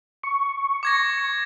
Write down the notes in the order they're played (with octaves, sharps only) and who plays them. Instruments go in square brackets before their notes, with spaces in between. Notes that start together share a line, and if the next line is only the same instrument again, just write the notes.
[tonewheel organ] C#6
[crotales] D6 G#6 A#6